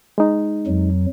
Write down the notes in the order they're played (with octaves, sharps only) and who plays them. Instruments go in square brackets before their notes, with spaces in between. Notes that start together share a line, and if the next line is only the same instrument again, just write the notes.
[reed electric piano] G#3 D#4
[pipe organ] F2 F#3